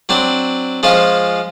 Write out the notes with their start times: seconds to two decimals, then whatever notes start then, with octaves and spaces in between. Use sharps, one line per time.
0.09 F#3 C4 D4 C5
0.83 F3 G#3 C#4 F4 C5